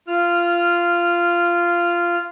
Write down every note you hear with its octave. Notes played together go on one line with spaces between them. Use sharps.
F4 F6